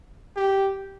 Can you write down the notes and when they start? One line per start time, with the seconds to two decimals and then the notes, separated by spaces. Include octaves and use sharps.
0.36 G4